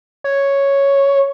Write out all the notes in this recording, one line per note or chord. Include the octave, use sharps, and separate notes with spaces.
C#5